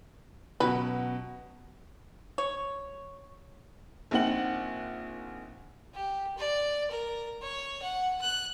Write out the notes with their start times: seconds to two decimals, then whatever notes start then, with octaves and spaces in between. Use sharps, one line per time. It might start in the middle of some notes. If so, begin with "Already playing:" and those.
0.60 B2 F#3 C#4 B4
2.38 C#5
4.11 A#1 A#2 C4 D#4 F#5 F#7
5.94 G4
6.38 D5
6.91 A#4
7.42 C#5
7.82 F#5
8.21 F#6